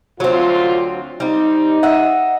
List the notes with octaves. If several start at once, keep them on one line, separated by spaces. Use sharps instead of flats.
D2 F#3 C4 F4
G3 C4 D#4
D#5 E5 F#5